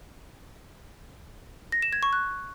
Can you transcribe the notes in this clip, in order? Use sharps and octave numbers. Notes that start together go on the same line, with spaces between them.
A#6
E7
G#6
C#6
F#6